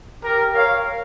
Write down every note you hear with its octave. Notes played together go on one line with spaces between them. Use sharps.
G4 A#4
C#5 F5